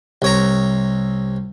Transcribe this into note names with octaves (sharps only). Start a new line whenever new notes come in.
C2 C#5 A#5